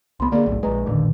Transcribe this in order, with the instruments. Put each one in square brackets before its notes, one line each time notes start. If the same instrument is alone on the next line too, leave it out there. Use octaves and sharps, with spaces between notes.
[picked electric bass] C2 B3 [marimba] B5 C6
[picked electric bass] D3 A#3 [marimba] G#4 D5
[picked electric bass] F#1 B1 A2
[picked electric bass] A#1 G#3 [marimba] B4 A#5
[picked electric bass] A1 D#2 D3 [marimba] A#2 D#3